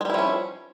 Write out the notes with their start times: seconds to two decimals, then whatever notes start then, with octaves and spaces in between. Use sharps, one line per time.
0.01 G#3
0.05 G3
0.10 E4
0.14 F3
0.19 C#4